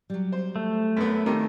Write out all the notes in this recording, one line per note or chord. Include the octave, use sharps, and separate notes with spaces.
F#3 G3
C5
A3
F#2 B3
D#3 G3 C4